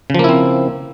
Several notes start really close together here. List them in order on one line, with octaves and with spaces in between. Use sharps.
C#3 F3 A#3 E4 C4